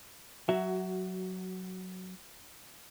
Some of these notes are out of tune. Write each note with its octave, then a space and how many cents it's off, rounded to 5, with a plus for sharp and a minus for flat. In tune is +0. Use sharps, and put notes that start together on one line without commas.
F#3 +0 F#4 +20 E5 +0